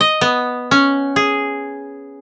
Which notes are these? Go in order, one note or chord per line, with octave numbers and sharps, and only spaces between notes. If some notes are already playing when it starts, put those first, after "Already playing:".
D#5
B3
C#4
G#4